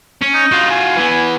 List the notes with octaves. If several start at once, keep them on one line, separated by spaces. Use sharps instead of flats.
C#4
D#4
F4 F#4
G#5
E3 B3